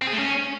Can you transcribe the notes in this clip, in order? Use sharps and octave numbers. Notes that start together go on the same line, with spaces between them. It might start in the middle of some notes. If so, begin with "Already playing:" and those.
C4
G#4
A3
C#4